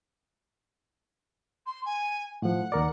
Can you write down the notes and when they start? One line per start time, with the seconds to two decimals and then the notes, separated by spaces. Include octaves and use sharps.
1.66 C6
1.85 G#5
2.42 A2 F3 F#5
2.72 D#2 A#4 D5